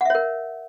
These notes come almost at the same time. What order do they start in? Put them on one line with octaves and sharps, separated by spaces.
F#5 E5 C#5 A#4